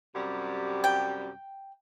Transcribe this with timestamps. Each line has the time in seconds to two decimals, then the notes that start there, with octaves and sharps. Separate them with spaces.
0.14 F#2 C3 G3
0.84 G5